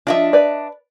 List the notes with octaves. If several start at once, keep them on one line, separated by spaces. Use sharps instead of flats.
F3 D4 F4 D#5 E5
B4 D5